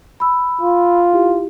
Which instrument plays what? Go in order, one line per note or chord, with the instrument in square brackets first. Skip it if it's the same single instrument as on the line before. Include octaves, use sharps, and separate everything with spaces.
[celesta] B5 E6
[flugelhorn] F4
[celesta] E4 G4